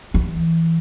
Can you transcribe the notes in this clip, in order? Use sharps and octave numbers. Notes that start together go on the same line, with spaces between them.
E3